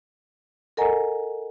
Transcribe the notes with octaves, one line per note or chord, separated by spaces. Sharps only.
A4 A#4 D#5 F#5 G#5 A#5